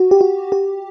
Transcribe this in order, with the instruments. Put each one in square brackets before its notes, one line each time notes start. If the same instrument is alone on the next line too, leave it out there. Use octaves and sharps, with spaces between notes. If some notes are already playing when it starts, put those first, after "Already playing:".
Already playing: [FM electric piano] F#4
G4
F#4
G4